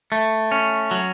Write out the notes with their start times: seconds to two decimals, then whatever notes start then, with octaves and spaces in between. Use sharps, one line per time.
0.12 A3
0.52 C#4
0.91 F#3